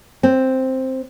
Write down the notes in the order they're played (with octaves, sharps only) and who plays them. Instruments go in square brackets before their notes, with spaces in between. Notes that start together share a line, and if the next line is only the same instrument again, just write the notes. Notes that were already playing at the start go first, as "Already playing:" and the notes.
[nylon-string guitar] C4